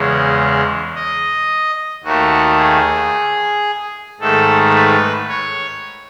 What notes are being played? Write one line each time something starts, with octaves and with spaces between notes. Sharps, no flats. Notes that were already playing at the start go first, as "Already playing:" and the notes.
Already playing: E2 C#3 G#3
D#5
D#2 D#3 A3 F#4
G#4
G#2 D#3 A3 A4
B4
C#5